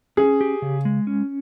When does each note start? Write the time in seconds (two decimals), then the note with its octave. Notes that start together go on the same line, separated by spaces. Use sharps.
0.17 C#4 G#4
0.41 G4
0.62 C#3
0.85 G#3
1.07 C#4